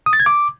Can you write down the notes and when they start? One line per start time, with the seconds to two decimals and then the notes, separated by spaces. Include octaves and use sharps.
0.06 D#6
0.13 A6
0.20 G#6
0.26 D6